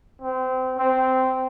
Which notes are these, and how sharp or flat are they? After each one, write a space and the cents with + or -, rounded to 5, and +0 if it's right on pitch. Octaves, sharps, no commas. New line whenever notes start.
C4 -25
C4 -15